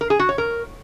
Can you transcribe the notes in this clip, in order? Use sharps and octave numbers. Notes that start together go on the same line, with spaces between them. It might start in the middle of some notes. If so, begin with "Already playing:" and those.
A#4
G#4
F#4
C#5
A#4